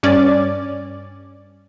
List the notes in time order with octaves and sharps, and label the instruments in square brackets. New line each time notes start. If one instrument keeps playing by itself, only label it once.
[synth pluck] G2 C#4 D5 A6